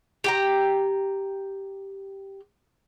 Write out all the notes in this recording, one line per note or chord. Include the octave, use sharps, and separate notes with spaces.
G4 G5 A#5